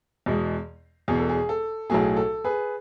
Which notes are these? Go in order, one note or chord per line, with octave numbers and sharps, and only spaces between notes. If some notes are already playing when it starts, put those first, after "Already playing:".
E2 B2 G#3
E1 E2 B2 G#4
A4
G#4
A4
B1 A2 F#3 A3 G#4
A4
G#4 B4